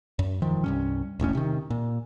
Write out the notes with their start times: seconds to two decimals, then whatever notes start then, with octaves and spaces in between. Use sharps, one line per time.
0.19 F#2
0.42 E1 D#3 F3
0.64 C2 G2 C#4
1.20 E1 A1 A2 C#4
1.35 C3 D#3
1.70 A#2